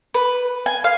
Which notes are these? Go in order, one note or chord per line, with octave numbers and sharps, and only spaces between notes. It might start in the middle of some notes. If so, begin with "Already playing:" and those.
B4
G#5
F5